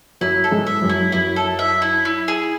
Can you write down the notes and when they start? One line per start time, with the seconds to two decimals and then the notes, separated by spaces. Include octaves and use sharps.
0.21 F#2 F#3 E4
0.44 A4
0.51 G#2 G#3
0.67 E5
0.82 F#2 F#3
0.89 E4
1.12 F#2 F#3 E4
1.36 A4
1.59 E5
1.82 E4
2.05 E4
2.28 G#4